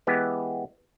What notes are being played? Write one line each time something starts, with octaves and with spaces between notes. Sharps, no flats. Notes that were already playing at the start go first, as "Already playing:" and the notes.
E3 G#3 B3 G4